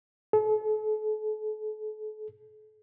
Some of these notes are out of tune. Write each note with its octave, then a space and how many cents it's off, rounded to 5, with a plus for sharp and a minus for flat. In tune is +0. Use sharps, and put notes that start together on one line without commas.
A4 -40